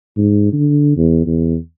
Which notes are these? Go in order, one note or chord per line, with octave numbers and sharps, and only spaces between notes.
G#2
D3
E2
E2